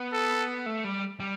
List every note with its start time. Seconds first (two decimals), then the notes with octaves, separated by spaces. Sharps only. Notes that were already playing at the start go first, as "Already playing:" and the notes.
Already playing: B3
0.13 A4
0.66 A3
0.84 G3
1.20 G3